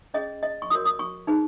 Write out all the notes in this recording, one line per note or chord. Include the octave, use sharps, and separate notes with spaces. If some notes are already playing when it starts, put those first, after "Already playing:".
C#4 G#4 C#5 D#5
D#5
C#6
F#4 A#4 C#5 D#6
D#6
C#6
D#4 G#4 B4